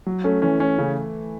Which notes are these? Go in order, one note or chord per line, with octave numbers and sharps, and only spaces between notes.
F#3
A3 C#4
E3 C#4
C#4
C#3